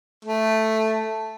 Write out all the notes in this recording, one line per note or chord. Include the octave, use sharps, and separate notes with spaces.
A3